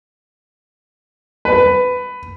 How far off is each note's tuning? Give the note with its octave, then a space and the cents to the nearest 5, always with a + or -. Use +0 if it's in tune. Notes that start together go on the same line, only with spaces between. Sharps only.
B4 +15